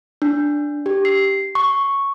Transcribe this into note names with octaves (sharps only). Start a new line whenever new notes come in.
D4
G4
C7
C#6